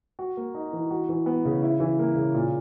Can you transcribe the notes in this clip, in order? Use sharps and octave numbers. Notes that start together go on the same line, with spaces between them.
F#4
A#3
D#4
E3
F#4
E3
B3
C#3
E4
E3
A#3
C#3
A#2